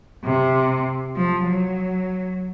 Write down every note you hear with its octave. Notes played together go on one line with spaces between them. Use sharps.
C3
F3
F#3